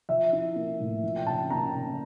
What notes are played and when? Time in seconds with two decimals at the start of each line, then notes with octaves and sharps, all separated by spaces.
0.09 F3 E5
0.33 E4
0.56 A#3
0.80 A2
1.03 F3
1.16 G5
1.27 C#3 A5
1.50 A#3 A#5
1.74 C#3